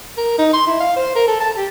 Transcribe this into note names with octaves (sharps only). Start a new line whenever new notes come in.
A#4
D#4
C6
E4
F5
C5
A#4
A4
A5
G4